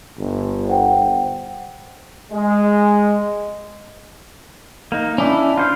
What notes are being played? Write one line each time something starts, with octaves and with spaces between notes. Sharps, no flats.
G1
C5 F#5 G5
G#3
A#3 D#4
C#4 D4 E4
F4 C5 F5